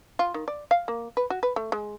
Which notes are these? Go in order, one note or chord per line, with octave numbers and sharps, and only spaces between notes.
F4
D#3
D5
F5
A#3
B4
F#4
B4
A3
G#3